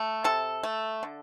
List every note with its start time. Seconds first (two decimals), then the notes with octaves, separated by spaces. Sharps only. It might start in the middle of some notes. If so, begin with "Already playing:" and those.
Already playing: A3
0.24 C3 A4
0.63 A3
1.03 D3